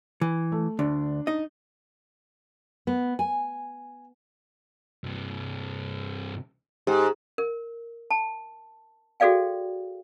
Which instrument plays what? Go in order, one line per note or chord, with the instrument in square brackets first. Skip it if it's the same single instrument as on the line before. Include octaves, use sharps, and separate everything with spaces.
[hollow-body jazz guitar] E3
[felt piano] A3
[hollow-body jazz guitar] D2 [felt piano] D4
[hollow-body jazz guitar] D#4 D#5
[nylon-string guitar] B3
G#5
[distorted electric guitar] G2 C3
[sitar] G#2 [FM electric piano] G4
[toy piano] A#4
A5
F#4 G#4 A4 D5 F5 G5